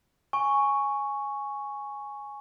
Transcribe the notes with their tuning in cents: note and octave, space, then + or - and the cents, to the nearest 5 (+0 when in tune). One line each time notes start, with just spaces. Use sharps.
G#5 +0 C#6 +0